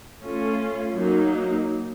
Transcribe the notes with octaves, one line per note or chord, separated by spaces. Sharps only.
A3 C#4 F4
F#3 A#3 D#4